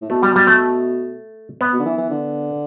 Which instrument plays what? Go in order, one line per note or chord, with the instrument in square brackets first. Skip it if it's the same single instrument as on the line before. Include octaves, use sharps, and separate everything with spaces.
[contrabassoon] A2
[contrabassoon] B2 [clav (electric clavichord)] A3
[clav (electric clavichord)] G3
G3
A3
B3
[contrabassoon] B2
D3
E3
E3
D3